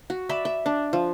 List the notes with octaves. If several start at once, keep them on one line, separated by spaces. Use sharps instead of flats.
F#4
D5 E5 B5
E5
D4
F3